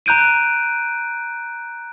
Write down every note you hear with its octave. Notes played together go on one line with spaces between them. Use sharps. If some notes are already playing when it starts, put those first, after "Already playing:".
A#5 F#6 G6 D7 D#7